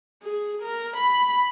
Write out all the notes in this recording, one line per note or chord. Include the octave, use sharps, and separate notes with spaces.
G#4
A#4
B5